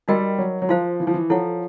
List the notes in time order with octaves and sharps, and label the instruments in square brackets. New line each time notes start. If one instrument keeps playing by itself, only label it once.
[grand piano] G3 [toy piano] D#4 F#4 A#4 D#5 G5
[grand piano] F#3
F#3
[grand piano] F3 [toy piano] C5 F5 A5 C6
[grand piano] E3
F3
E3
[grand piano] F3 [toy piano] E4 A4 C#5 F#5